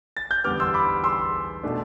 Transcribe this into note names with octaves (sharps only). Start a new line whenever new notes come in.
A6
G6
E2 D3 G3 B3 D6 F6
C6 E6
B5 D6
C6 E6
B2 A3 D4